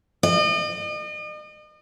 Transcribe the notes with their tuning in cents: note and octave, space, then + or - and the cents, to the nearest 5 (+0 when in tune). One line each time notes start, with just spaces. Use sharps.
D#5 -40